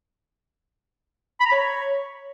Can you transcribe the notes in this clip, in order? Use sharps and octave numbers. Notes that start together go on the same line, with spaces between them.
B5
A#5
C#5